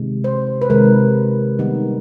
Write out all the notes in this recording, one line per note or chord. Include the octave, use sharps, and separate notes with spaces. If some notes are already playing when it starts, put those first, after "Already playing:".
Already playing: C3 D#3 G#3
C5
B4
C3 D#3 G#3 A#4
D#3 G3 B3 D#4